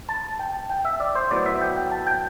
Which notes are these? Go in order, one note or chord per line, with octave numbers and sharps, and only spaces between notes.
A5
G5
G5
E5
D5
C5
A2 F#3 B3 D5
E5
G5
G5
A5
G5